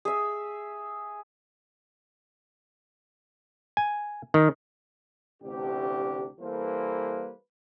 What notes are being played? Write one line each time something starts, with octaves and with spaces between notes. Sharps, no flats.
G#4 E5
G#5
D#3
A1 D2 C3 D4 G4
E3 G3 A#3 A4 B4 C5